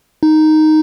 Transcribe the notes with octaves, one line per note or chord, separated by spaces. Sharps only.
D#4